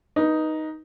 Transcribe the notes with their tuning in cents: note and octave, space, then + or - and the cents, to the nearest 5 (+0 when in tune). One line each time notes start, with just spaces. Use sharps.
D#4 +5 B4 -25